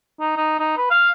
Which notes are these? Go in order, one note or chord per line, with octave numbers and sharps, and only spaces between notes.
D#4
D#4
D#4
B4
F5